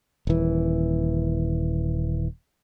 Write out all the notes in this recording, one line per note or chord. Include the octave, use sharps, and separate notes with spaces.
D#1 E3